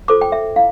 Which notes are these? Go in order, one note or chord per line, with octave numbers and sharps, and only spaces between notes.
F4 A4 C5 D6
G5
E5
E4 F5